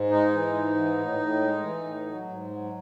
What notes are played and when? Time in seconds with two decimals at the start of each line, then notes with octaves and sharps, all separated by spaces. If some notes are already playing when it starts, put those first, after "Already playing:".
Already playing: G#2
0.10 G#3 D#4
0.32 E3
0.53 G#2
0.76 E3
0.97 A2
1.19 A2
1.42 G#3
1.63 E3
1.84 A2
2.06 F#3
2.29 G#2
2.51 F#3